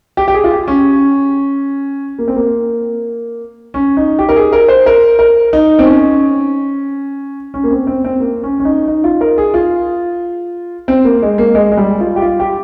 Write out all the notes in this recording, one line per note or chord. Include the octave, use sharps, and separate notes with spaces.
G4
G4
G#4
F4
G4
C#4
A#3
C4
A#3
C#4
D#4
G4
A#4
G#4
A#4
C5
A#4
A#4
D#4
C4
C#4
C#4
A#3
C4
C4
C4
A#3
C#4
C#4
D#4
D#4
F4
A#4
G#4
F4
C4
A#3
G#3
A#3
G#3
G#3
G3
F4
G4
F4
G4